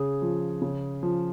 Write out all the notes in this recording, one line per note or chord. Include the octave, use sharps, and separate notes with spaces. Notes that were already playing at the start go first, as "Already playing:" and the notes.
Already playing: C#3 G#4
F3
C#3
F3